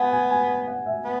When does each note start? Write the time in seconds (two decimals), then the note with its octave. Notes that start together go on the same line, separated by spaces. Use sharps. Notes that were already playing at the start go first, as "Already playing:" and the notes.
Already playing: B3 F#5 G#5
0.12 G#5
0.30 G#5
0.48 G#5
0.67 F#5
0.86 E5
1.05 B3